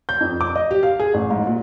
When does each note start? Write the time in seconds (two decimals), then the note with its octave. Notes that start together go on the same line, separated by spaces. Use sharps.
0.09 G6
0.21 F2
0.41 D6
0.56 D#5
0.71 G4
0.83 F5
0.99 G#4
1.14 A1
1.31 G#2
1.47 A#2